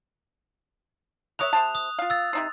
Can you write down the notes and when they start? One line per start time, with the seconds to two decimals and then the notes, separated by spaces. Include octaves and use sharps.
1.39 A#4 C#5 E5 D#6 F#6 F7
1.53 C3 C5 A5
1.75 D#6
1.99 F4 F5
2.10 E6 A6
2.33 C3 D#4 C5